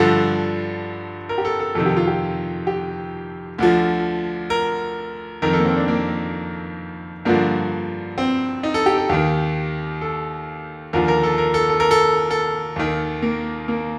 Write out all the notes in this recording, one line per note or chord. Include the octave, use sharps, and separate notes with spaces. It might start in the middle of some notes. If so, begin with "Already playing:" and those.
Already playing: G2 D3 F3 A4
A#4
G4
A4
A4
F2 C3 D#3 A4
G4
F4
G4
G4
D2 D3 F3
A#4
F2 D#3 A#4
A4
A#3
C4
D4
A#3
G2 D3 F3 A#3
C4
D#4
A4
G4
A4
D#2 D#3 G4
A4
D#2 D3 F3 A#4
A#4
A4
A#4
A4
A4
A#4
A4
A4
D#2 D#3
A#3
A#3